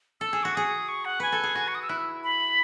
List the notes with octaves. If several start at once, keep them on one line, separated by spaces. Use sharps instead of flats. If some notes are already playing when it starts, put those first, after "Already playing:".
A4 E6
G#4
F#4 C#6
G#4 D#6
C#6
F#5
B4 G#5
A4
G#4
F#4
C#6
D#6
E6
E4 F#6
E6
B5